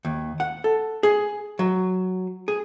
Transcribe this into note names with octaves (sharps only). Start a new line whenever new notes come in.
D#2
F#5
A4
G#4
F#3
G#4